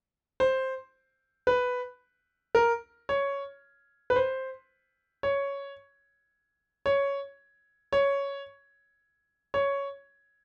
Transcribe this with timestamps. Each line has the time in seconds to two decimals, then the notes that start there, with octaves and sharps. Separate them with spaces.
0.40 C5
1.47 B4
2.55 A#4
3.09 C#5
4.10 B4
4.16 C5
5.23 C#5
6.86 C#5
7.93 C#5
9.54 C#5